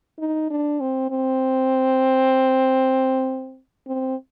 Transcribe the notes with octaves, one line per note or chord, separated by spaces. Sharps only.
D#4
D4
C4
C4
C4